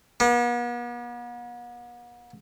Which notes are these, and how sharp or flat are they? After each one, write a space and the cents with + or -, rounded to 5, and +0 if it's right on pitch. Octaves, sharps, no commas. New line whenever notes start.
B3 -45